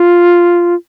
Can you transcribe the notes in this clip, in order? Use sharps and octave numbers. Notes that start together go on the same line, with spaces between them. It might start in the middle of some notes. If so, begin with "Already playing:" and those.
Already playing: F4